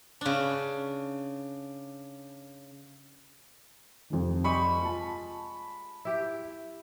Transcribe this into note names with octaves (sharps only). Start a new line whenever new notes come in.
C#3 D4
F2 C3 D#3
G3 G#3 G#4 B5 C#6
F4 A5
E4 G4